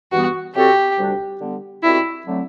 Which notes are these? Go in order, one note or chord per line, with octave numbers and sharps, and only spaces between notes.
G2 E3 G3 B3 F#4
C3 F#3 C4 F#4 G4 A4
D2 C3 G3 D4
D3 G3 B3
B2 G3 C4 E4 F#4 A4
D3 F#3 A3 C4